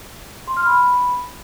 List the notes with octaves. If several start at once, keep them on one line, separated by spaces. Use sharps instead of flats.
C6
F6
B5